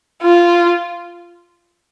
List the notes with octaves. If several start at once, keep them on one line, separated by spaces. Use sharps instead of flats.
F4